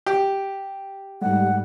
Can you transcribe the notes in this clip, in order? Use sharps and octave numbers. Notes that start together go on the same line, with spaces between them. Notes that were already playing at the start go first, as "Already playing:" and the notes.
G4
G#2 G3 A3 F#5